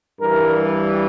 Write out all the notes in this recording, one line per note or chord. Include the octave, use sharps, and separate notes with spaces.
G2 E3 G3 A#4